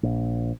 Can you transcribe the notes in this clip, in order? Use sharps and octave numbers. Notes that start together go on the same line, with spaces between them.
A#1